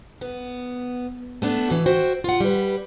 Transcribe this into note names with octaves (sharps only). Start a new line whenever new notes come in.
B3
A3 B3 D4
B2 E3
F#4 C5 E5 G5
F4 F#5
G3 B4